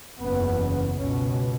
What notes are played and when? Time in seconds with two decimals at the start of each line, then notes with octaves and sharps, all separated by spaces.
0.21 F#1 E2 C#3 B3
0.98 C#2 B2 C#4